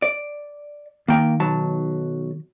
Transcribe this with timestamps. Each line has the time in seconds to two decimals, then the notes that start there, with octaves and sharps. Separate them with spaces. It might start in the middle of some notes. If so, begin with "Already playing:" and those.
0.02 D5
1.08 D#3 A#3 G5
1.40 B1 F#3 A5